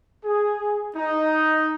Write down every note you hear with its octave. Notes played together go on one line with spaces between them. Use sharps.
G#4
D#4